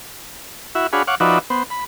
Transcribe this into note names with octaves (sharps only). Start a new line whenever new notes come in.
E4 F#4 E5
D4 F#4 G#4 C#5 F5 B5
C#5 F5 F#5 D6
F3 D#4 F#4 B4 D5 E5
B3 C5
B5